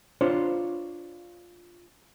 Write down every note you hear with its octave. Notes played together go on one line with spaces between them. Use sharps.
D4 F4 C5 C#5